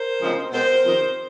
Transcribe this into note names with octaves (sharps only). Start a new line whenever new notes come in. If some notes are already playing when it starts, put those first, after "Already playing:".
Already playing: A#4 C5
D2 C#3 F3 G#3 C4
B2 G#3 C4 A#4 C5
F2 C3 D#3